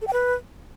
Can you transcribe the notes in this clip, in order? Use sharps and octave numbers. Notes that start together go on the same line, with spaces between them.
A4
G5
B4